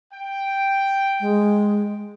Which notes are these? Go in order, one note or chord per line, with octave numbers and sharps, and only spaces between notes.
G5
G#3